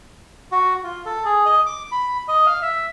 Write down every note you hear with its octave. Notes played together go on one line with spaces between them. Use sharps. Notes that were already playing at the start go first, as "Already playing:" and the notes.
F#4
F4
A4
G#4
D#5
D6
B5
D#5
F5
E5